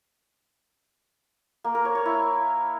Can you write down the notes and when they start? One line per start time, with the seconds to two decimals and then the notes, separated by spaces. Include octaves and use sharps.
1.64 A#3
1.75 A#4
1.85 C#5
1.95 C#5
2.05 E4